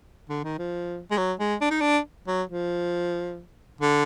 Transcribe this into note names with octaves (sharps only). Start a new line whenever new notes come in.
D3
D#3
F3
G#3
F#3
G#3
D4
D#4
D4
F#3
F3
D3